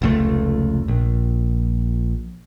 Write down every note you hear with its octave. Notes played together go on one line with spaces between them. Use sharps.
F1 C#2 A3
A#1